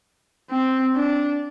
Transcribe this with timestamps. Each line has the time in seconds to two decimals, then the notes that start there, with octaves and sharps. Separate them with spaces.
0.51 C4
0.95 D4